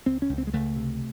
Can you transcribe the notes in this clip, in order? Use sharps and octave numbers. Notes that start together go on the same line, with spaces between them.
C#2 C4
C#4
C#2
C4
G#3
C#2 A3
C3